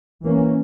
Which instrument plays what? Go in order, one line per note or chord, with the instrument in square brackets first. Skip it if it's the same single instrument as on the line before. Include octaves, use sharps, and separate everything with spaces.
[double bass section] E3 A#3 C#4